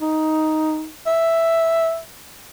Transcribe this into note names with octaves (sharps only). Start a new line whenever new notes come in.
D#4
E5